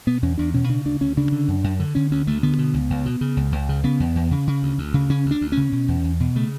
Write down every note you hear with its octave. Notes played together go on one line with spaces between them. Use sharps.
B2 B3
E2 C#4
E2 D4
B2 C#4
C#3 D4
D2 D4
D2 C#4
C#3 D4
D3
F#2
F#2
D3
D3 C#4
D2 C#4
D2 A3
D3 B3
B2
C#2
C#2
B2
C#3
C#2
C#2
C#3
C#3 B3
E2
E2
C#3
C#3
D2
D2
C#3
C#3 C#4
D2
D4
D2
C#4
C#3
B2
E2
E2
B2
C#3 A3